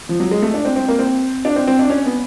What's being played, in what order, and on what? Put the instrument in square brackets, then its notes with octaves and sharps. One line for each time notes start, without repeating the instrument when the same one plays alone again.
[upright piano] F3
F#3
G#3
A3
D4
C4
C4
A#3
C4
D4
C4
C4
D4
C#4
B3